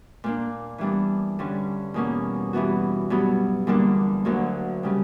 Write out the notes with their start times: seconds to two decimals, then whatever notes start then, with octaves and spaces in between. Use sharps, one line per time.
0.24 A#2 A#3 D4
0.78 E3 G3 B3 D4
1.39 G2 D3 G3 C#4
1.94 E2 B2 A#3 C#4
2.53 G2 E3 B3 F#4
3.10 G2 F#3 B3
3.67 E2 D3 G3 A#3 D4
4.25 D2 D3 F#3 A#3
4.83 C#3 G3 C#4